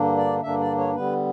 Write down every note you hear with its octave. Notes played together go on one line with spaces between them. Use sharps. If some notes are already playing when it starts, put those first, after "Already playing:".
Already playing: G2 D3 A#3 D4
D5
G2 D3 A#3 D4 E5
D5
C#5
D3 G3 B3 B4